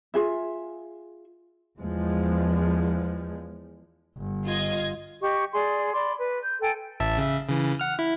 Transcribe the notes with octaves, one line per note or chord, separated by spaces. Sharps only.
F4 G#4 E5
E2 F3 G#3
G1
F4 D#5 G#6
G4 D#5 C#6
G#4 D5 C6
D5 B5 C6 D6
B4
G6
A4 G5 G#5
A1 E5 A5
C#3 E5
C#3 E3
F#5 F6
E4